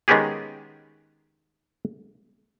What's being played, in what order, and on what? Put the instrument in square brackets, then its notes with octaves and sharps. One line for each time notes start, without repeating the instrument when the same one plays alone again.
[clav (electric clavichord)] D#3 G#3 B3 C#4 G4 G#4